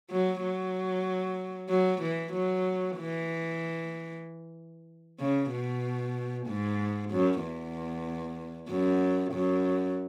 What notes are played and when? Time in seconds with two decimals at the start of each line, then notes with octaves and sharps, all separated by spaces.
0.11 F#3
0.42 F#3
1.69 F#3
2.02 E3
2.33 F#3
2.98 E3
5.20 C#3
5.51 B2
6.47 G#2
7.11 F#2
7.42 E2
8.69 F#2
9.33 F#2